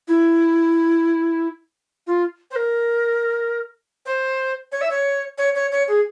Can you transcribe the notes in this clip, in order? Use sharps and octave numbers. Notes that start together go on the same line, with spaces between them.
E4
F4
C5
A#4
C5
C#5
E5
C#5
C#5
C#5
C#5
G#4